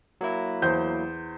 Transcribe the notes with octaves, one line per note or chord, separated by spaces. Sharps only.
F#3 A#3 E4
E2 C5 G6